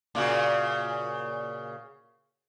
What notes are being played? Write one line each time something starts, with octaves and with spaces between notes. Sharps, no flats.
A#2 C#3 F#4